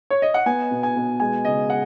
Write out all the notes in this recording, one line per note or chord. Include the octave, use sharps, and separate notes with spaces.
C#5
D#5
F#5
B3 G#5
B2
G#5
B2
G#3 G#5
C#3 D#5
F#5